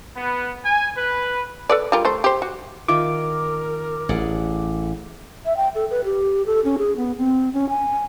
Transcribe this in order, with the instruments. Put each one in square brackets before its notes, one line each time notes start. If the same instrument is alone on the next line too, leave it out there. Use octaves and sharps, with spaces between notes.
[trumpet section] B3
G#5
B4
[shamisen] A4 B4 D5
G3 F4 A#4
A3 C5
G4 C5
F#4
[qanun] D#3 F4 E5 [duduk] A#4 [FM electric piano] D6
[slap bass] A1 [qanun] G#4 D5 F#5
[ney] E5
G5
A4
B4
G4
A4
C#4
G#4
B3
C4
C#4
G#5